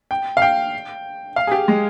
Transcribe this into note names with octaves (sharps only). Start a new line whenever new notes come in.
G5
F5
G5
F5
G#4
G4
G#3